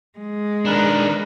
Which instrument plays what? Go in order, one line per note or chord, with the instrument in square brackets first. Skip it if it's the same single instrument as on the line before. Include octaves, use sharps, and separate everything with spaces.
[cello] G#3
[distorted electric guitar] D#3 D4 [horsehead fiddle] A#4 B4